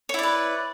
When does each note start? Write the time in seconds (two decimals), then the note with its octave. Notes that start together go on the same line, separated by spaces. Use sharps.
0.09 C#5
0.14 E4
0.19 D5
0.23 B4